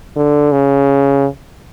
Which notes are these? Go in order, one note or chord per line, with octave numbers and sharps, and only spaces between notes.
D3
C#3